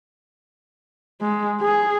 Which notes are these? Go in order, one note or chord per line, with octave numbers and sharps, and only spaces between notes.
G#3
G#4